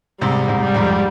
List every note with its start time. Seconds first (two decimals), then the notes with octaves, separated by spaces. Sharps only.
0.21 G#2 C3 G3
0.48 G#2 C3
0.61 G3
0.74 F2 G#2